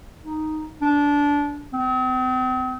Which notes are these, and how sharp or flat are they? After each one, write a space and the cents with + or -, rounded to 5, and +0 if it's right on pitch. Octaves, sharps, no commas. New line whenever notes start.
D#4 +0
D4 -20
C4 -40